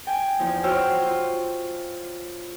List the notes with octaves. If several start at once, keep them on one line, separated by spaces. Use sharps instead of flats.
G5 G#5
E2 F3 D#4
F#4 C5 C#5 G5 E6 F6
F4